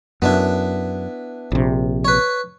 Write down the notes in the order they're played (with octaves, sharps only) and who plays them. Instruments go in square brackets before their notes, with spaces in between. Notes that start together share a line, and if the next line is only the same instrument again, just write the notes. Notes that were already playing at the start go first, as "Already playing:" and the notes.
[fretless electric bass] F#2 [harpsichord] B3 D4 E4
[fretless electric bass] A#1 C3
[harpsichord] B4 C#5